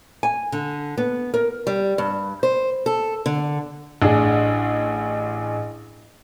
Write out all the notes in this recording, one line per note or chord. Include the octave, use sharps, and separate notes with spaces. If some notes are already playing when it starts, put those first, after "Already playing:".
G#5
D3
B3
A#4
G3
G2
C5
A4
D3
A1 D4 G#4